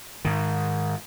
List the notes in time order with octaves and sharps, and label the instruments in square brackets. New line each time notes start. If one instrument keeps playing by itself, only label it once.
[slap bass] G#2 D#3